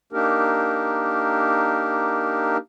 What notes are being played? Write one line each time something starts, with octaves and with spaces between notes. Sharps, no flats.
A#3 D4 D#4 G4 A#4